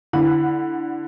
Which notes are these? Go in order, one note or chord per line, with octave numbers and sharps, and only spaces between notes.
D3 E4 F#5 B5